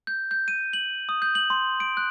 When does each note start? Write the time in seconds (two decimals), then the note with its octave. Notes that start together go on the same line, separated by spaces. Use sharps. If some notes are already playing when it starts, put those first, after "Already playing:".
0.07 G6
0.31 G6
0.48 D#7
0.73 F#7
1.09 D#6
1.22 G6
1.35 F#7
1.50 C6
1.80 D7
1.97 F#6